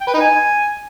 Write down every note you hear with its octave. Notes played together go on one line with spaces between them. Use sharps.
G5
B4
D#4
G#5